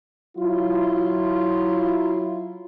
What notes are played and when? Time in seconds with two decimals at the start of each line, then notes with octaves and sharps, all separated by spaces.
0.38 F#3 E4 F4